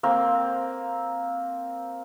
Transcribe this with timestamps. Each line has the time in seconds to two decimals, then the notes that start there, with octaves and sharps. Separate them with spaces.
0.03 A#3 C4